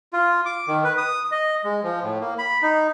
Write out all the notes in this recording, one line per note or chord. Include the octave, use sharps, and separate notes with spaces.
F4
D6
D#3
B4
D#6
D#5
G#3
F3
A2
A#3
B5
D#4